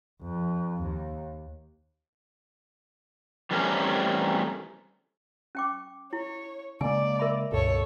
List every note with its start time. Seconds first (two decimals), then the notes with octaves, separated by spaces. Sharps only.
0.22 F2
0.82 D#2
3.51 E3 G3 A3 C4 C#4 A#4
5.55 C#4 G5 D6
6.13 E4 C#5
6.81 C#3 G#3 A#3 D5 G#5
7.19 A#4 E5 B5
7.52 C#2 G2 B2 A4 C#5